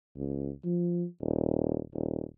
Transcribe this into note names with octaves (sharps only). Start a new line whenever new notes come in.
C#2
F3
D#1
D#1